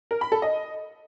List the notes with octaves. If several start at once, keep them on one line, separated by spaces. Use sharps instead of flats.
A#4
B5
A4
D#5